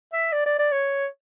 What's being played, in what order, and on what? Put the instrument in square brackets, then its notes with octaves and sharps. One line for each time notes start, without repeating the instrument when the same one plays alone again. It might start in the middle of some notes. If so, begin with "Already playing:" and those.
[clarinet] E5
D5
D5
D5
C#5